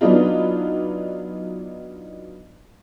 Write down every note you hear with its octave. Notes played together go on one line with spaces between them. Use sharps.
F#3 B3 D4 D#4 F4